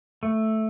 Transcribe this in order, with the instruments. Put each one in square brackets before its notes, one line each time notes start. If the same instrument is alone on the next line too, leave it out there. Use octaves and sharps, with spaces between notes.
[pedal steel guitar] A3